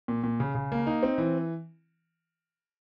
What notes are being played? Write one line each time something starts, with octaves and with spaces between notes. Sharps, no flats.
A#2
A#2
C#3
C#3
A#3
D#4
C4
E3